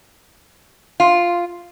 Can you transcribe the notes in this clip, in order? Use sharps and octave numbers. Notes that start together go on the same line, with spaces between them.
F4